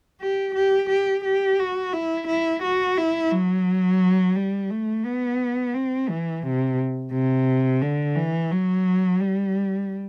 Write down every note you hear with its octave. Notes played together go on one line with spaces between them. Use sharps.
G4
G4
G4
G4
F#4
E4
E4
F#4
E4
F#3
G3
A3
B3
C4
E3
C3
C3
D3
E3
F#3
G3